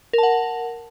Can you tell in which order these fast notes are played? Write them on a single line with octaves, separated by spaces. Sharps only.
A#4 A5 F#5